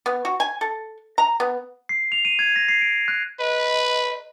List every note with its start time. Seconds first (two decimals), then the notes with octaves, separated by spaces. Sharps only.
0.06 B3
0.25 F#4
0.40 G#5
0.61 A4
1.18 A#5
1.40 B3
1.89 C7
2.12 F7
2.25 D#7
2.39 G#6
2.56 A#6
2.68 C7
2.81 D7
3.08 F#6
3.40 B4 D#5